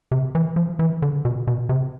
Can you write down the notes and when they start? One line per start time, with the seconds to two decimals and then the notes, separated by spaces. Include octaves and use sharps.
0.11 C3
0.35 E3
0.56 F3
0.79 E3
1.02 D3
1.25 B2
1.47 B2
1.69 C3